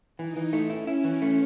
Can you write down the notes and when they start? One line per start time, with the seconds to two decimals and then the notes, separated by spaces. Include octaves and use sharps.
0.19 E3 D#4
0.37 E3
0.53 A3
0.70 C#4 E4
0.87 E4
1.04 E3
1.22 A3